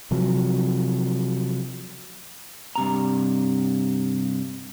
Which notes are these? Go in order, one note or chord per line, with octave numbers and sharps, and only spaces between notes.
C3 F3 F#3
G2 C3 A#5